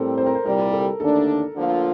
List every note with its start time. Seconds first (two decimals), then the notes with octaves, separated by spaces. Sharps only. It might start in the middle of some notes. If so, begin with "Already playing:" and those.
Already playing: A2 G3 C4 A4 A#4
0.18 C5
0.26 A#4
0.35 C5
0.45 C2 A#2 G3 A#4
0.72 A4
1.00 D#2 D3 A3 D4 A4
1.55 D2 D3 F3 A#3 F4